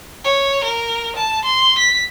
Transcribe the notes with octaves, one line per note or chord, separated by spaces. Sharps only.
C#5
A#4
A5
C6
B6